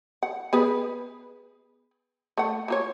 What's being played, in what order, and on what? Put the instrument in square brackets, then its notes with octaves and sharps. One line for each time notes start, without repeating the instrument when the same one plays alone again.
[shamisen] F#5
B3 G#4 B4
A3 F#5
A#3 F4 C#5